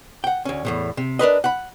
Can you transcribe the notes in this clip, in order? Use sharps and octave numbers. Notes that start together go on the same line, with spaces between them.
F#5 G5
D2 C#4
E2 A2 C3
C3
D4 A#4 B4 D#5
F#5 B5